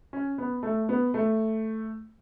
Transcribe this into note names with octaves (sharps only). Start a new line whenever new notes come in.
C#4
B3
A3
B3
A3